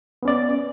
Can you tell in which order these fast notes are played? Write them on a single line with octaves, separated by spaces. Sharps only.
B3 C#4 D5